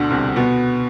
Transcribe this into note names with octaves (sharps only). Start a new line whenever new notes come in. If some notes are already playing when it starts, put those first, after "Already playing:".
Already playing: D2 B2 D3
C2 C3
B2 B3